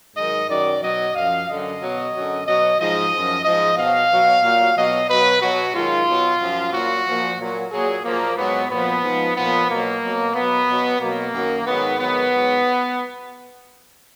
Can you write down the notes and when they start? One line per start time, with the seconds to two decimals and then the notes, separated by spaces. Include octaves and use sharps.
0.16 G#2 D#3 F#3 D#5
0.49 F#2 D#3 F#3 D5
0.82 B2 F#3 D#5
1.15 F#2 F3 F5
1.48 F#2 D3 F#3 D#5
1.81 B2 F#3
2.14 F#2 D3 F#3
2.46 B2 F#3 D#5
2.79 G#2 F3 D#5
3.12 F#2 F3
3.45 G#2 F3 D#5
3.77 B2 F#3 F5
4.10 B2 F#3
4.43 A#2 F#3
4.76 B2 F#3 D#5
5.09 B2 F#3 B4
5.42 B2 F#3 F#4
5.75 G#2 D#3 F#3 F4
6.08 B2 F#3
6.41 F#2 F3
6.73 A#2 F#3 F#4
7.06 A#2 F3
7.39 A#2 F#3
7.72 A#2 F#3 G#4
8.05 A#2 F3 A#3
8.37 G#2 F#3 B3
8.71 A#2 F3 B3
9.03 G#2 F3
9.36 A#2 F3 B3
9.69 B2 F#3 A#3
10.02 B2 F#3
10.35 B2 F#3 B3
10.67 B2 F#3
11.00 B2 F#3 A#3
11.33 F#2 D#3 F#3
11.66 G#2 D#3 F#3 B3
11.99 G#2 D#3 F#3 B3
12.32 G#2 F#3